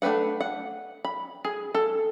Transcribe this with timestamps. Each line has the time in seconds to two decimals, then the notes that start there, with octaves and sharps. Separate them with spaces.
0.02 A3 D4 A4 B4 F#5
0.41 F#5
1.05 B5
1.45 G#4
1.75 A4